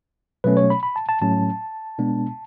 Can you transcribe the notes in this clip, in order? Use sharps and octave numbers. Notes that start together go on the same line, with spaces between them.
B2 F#3 A3 C#4 B4
C#5
B5
B5
A5
A5
A2 F#3 A3 C#4 A5
B2 G#3 B3 D4